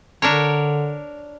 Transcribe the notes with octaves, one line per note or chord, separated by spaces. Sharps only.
D3 D4 A#4 C#5